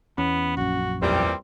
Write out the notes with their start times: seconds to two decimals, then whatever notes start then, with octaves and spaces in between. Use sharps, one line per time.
0.18 E2 B3 C#4
0.57 A#1 F#2 F#4
1.02 E2 A#2 E3 G3 C4